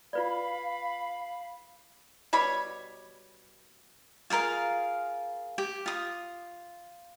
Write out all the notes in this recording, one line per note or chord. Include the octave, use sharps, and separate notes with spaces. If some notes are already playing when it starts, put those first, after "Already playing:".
F4 B4 D5 F5 B5
B2 G3 C#5 B5
F4 G#4 A#4 F5
G4
F4 D#6